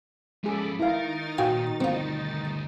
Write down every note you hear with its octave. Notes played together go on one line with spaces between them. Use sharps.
F3 G#3 C#4 G#4 A4 B5 D6
D#3 D#4 E4 A#4 F5 A6
A#2 F#4 F5 G5 G#5
D2 G3 C4 F4